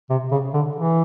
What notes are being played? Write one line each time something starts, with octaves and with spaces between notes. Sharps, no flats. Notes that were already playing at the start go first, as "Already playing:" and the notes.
C3
C#3
D3
E3